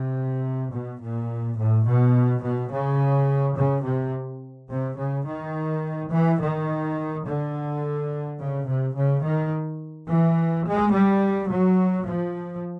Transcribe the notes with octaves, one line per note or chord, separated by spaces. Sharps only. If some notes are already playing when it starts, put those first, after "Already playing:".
Already playing: C3
B2
A#2
A2
B2
B2
C#3
C#3
C3
C3
C#3
D#3
E3
D#3
D3
C#3
C3
C#3
D#3
E3
G#3
G3
F#3
F3